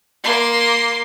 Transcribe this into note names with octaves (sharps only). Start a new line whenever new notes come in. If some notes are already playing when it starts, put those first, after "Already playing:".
A#3 C6